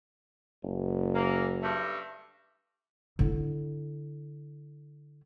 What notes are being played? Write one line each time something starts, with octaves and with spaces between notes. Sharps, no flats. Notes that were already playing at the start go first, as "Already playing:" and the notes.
F#1
E3 A#3
G2 A3
D3 E4